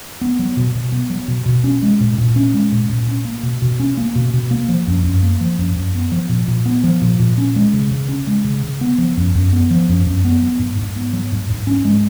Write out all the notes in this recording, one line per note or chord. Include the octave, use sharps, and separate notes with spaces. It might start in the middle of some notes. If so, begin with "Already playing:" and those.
B3
F#3
B2
B2
B3
F#3
B2
B2
C#4
G#3
A#2
A#2
C#4
G#3
A#2
A#2
C#4
A#3
B2
B2
C#4
A#3
B2
B2
A#3
F3
F#2
F#2
A#3
F3
F#2
F#2
B3
F3
A#2
A#2
B3
F3
A#2
A#2
C#4
G#3
C#3
C#3
C#4
G#3
C#3
C#3
B3
F3
F#2
F#2
B3
F3
F#2
F#2
B3
F#3
G#2
G#2
B3
F#3
G#2
G#2
C#4
G#3